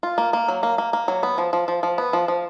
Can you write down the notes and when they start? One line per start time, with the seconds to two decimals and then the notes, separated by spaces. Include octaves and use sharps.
0.03 F4
0.18 A#3
0.33 A#3
0.48 F#3
0.63 A#3
0.78 A#3
0.93 A#3
1.08 F#3
1.23 B3
1.38 F3
1.53 F3
1.68 F3
1.83 F3
1.98 B3
2.13 F3
2.28 F3